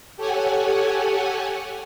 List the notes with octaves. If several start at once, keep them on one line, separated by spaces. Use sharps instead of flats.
G4 A4 C#5 F#5 G#5